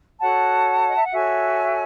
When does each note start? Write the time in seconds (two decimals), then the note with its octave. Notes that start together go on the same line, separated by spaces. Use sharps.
0.20 F#4 A4 C#5 F#5 A5
0.87 D#5
0.95 E5
1.03 F#5
1.12 F#4 A4 C#5 E5 G#5